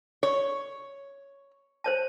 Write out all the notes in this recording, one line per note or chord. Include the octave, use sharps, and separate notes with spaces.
C#5 C#6
C5 C#5 A5